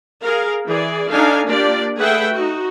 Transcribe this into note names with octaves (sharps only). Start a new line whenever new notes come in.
G#4 A#4 F5
E3 G#4 D5
D4 D#4 A4 F5 G#5
A#3 D4 F4 G4 D5
A3 G#4 B4 E5 F#5 G5
D#4 F#4